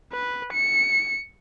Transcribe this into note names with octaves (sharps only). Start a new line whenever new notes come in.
B4
C#7